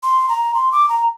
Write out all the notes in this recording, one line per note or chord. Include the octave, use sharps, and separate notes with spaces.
C6
A#5
C6
D6
A#5